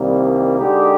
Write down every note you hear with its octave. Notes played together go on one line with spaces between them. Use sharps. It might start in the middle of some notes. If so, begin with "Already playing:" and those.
Already playing: C2 C3 D#3 G3 A#3
D3 G#3 D#4 G4